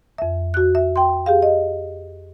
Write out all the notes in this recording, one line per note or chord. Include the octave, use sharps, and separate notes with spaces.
F2 E5
F#4 F#6
E5
G5 C6
G4 G#4 F5
D#5